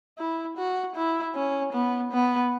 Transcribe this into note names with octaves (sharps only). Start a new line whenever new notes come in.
E4
F#4
E4
C#4
B3
B3